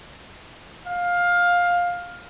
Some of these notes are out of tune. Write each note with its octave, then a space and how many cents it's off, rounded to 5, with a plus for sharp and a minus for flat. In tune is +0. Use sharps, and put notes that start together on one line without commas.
F5 +15